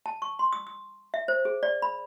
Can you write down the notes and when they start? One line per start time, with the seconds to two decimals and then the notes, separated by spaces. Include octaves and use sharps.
0.06 A5
0.22 C#6
0.39 C6
0.53 D#6
0.67 D#6
1.14 E5
1.28 C5
1.45 G#4
1.63 D5
1.82 B5